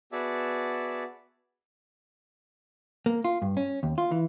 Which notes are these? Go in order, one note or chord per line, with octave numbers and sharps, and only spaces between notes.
B3 F#4 G#4 D5 E5 A5
A#3
F4
G2
C#4
D#2
F4
E3